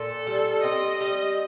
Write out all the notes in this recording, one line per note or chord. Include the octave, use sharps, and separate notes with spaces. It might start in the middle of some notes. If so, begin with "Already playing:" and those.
Already playing: A#2 A4
G3
C4 D#5
G3